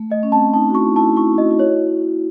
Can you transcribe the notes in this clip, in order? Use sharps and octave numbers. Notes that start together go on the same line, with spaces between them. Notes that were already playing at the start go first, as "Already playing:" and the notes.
Already playing: A3
A3 D#5
C#4
C4 A5
D#4 A5
F#4
E4 C#6
E4 A5
E4 C#6
F#4 D#5
E4
F#4 C#5